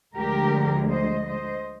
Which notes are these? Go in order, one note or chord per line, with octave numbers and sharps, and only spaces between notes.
D2 D3 F3 G#3 G4 A#4
C5 D#5
C5 D#5